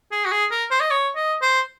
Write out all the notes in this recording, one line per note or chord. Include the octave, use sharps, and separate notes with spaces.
G#4
F#4
G#4
A#4
C5
D#5
C#5
D#5
C5